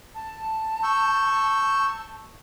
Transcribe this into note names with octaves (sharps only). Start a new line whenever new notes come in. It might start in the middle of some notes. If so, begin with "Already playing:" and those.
A5
C#6 E6 G6